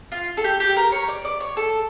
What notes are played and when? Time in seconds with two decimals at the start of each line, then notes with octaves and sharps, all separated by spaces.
0.12 F4
0.37 A4
0.44 G4
0.60 G4
0.76 A#4
0.92 C#5
1.08 D5
1.25 D5
1.40 C#5
1.57 A4